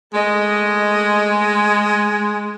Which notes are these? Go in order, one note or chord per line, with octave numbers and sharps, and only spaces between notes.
G#3 A3 D#5